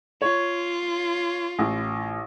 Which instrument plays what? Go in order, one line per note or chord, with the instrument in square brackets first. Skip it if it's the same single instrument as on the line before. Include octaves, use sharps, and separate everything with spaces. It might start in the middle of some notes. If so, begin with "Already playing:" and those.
[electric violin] F4 [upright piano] C#5
[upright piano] A1